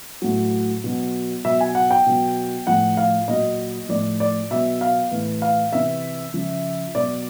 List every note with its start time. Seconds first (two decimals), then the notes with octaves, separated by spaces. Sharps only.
0.22 A2 F#3
0.84 B2 F#3
1.45 B2 F#3 E5
1.61 G#5
1.75 F#5
1.91 G5
2.06 B2 F#3
2.67 A2 F3 F#5
2.97 F5
3.28 A#2 F#3 D#5
3.89 A2 F3 D5
4.20 D5
4.51 B2 F#3 E5
4.81 F5
5.11 A2 E3
5.42 F5
5.73 C3 E3 E5
6.33 C#3 F3
6.95 B2 F#3 D5